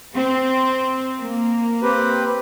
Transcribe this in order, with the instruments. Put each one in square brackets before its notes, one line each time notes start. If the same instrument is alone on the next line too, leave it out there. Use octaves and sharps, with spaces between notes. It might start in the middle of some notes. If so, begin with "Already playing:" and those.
[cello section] C4
A#3
[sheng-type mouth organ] C4 G4 B4